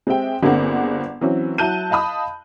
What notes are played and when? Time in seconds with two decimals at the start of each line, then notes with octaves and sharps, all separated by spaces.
0.07 G#3 C4 G4 E5 G5
0.43 G1 D3 A#3 C4 G#4 F#5
1.21 E3 F#3 C4 C#4
1.58 F#3 E4 A5 F#6 G6 D#7
1.90 D#5 F5 A5 B5 D#6